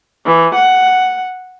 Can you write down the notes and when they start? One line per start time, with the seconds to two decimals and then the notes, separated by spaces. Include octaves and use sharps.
0.25 E3
0.55 F#5